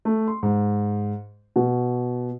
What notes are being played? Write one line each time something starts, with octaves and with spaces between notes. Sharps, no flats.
A3
C6
G#2
B2